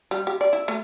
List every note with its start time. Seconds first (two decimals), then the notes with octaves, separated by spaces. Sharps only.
0.11 G3
0.27 G4
0.41 D5
0.53 E4
0.68 A3